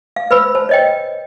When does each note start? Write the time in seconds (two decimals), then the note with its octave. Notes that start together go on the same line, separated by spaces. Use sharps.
0.16 F5
0.31 B4 C5 B5 E6
0.55 C5 A5
0.69 C#5 D#5 G5